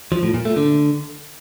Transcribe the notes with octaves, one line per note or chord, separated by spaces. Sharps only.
F3
A2
A#2
A3
D3